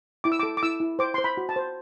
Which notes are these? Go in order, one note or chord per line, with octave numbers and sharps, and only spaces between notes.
E4 D6
E6
A4 D6
D6
E4 E6
E4
C5 D6
C5 C6
B5
F#4
A5
C5